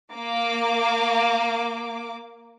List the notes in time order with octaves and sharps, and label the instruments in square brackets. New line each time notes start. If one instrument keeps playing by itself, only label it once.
[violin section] A#3 D6